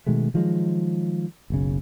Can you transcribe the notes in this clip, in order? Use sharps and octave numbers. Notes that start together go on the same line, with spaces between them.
B2 D#3 G#3 A3
D#3 F3 F#3 G#3
F#1 B1 C#3